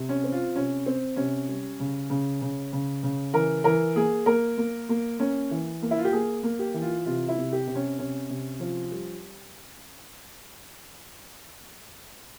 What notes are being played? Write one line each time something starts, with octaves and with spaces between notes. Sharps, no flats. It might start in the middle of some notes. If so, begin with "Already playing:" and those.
Already playing: C3
C#4
C4
F4
C3 C#4
C4
C3 C#4
G3
C#3
C#3
C#3
C#3
C#3
E3 A#4
E3 A#4
A#3 G#4
A#3 A#4
A#3
A#3
A#3 C#4
E3
A#3
E4
F4
G4
A#3 G#4
A#3
G4
E3
F4
C3 F4
E4
C3
G4
C3
C#4
C3 C#4
C3
F3
G3